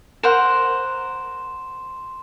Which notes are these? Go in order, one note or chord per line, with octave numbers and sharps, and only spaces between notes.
A#4 C5 F#5 C6 E7